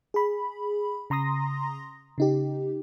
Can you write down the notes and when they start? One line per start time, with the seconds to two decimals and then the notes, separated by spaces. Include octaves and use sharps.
0.14 G#4 B5
1.10 C#3 A#5 C6 D#6 A#6
2.18 C#3 D#4 G4